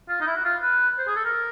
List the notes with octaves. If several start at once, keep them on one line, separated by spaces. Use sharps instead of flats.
F4
D#4
E4
F#4
F4
B4
C5
G#4
A4
A#4